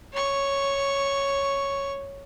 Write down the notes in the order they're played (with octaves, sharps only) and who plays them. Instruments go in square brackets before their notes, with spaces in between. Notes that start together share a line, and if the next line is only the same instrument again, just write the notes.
[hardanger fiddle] C#5 C#6